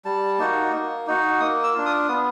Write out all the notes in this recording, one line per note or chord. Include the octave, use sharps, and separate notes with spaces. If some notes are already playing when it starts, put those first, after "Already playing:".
G3 A5
A#3 D#4 F#4
A#3
D#4 F#4
A#3 D#6
E6
D4 F4
D#6
B3 D#6